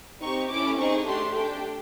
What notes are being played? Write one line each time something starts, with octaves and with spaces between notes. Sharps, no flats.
C4 D#4 G4 C#6
A3 C#4 E4 D6
C4 D#4 G#4 C#6
A3 D4 G4 C6
D4 G4 G5